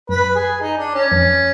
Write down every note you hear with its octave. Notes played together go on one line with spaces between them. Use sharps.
F#2 B4
G#4
D#4
D4
C#4
F2